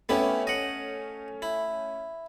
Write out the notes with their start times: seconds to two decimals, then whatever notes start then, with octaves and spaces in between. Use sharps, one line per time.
0.09 A3 B3 C#4 E4 G4
0.47 D#5 F#5
1.42 E4